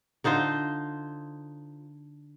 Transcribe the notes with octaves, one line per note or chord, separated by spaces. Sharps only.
D3 D#4 F4 C5